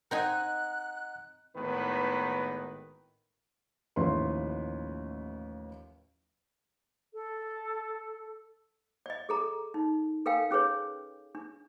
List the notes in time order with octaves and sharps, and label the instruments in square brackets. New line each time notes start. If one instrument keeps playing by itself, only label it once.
[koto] C4 D#4 G#5 [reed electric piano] D#5 F#5 A#5 [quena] F#6
[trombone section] G#1 A2 D#3 B3 B4
[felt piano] A1 D#2 F3 E4 B4 C6
[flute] A4
[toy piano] D5 D#5
G#4 A4 A#5
D#4
A4 A#4 F5 G5 G#5
C#4 G#4 B4 C#5
D4